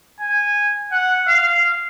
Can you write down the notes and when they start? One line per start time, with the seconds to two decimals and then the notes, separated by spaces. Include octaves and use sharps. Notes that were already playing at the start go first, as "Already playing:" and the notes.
0.21 G#5
0.92 F#5
1.28 F5